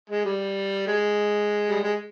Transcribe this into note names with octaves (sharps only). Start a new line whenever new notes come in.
G#3
G3
G#3
G3
G#3